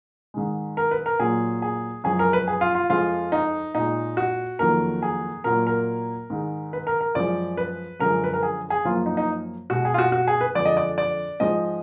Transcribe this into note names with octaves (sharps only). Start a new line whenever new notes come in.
G#2 D#3 G#3
A#4
B4
A#4
A#2 F#3 A#3 G#4
G#4
F#2 F3 G#3 G#4
A#4
B4
G#4
F4
F4
F2 F3 G#3 F4
D#4
A#2 G#3 D#4
F#4
F2 D#3 F#3 A#3 A#4
G#4
A#2 F#3 A#3 A#4
A#4
G#2 D#3 G#3
B4
A#4
A#4
F#2 F3 G#3 D5
B4
F#2 D3 F3 G#3 A#4
B4
A#4
G#4
G#4
F#2 F3 A#3 F4
D#4
D#4
B2 G#3 F#4
G#4
F4
F#4
F#4
G#4
B4
F2 D3 G#3 D5
D#5
D5
D5
G#2 F3 G#3 D#5